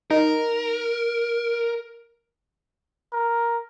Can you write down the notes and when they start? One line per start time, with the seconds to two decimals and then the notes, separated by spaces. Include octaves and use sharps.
0.11 D#4 A#4
3.13 A#4